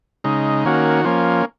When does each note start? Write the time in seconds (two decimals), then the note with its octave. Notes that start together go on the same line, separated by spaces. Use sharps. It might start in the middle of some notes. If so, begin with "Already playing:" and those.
0.24 C#3 G#3 D#4
0.65 D#3 A#3 C#4 F#4
1.04 F3 A#3 C#4